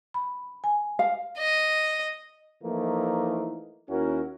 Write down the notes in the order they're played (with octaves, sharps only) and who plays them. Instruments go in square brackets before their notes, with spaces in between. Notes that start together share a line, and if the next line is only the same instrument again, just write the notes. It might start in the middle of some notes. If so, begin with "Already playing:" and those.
[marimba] B5
G#5
[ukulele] F5
[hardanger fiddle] D#5
[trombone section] E3 F3 A3 A#3 D#4 E4
D#2 C#4 E4 F#4 A#4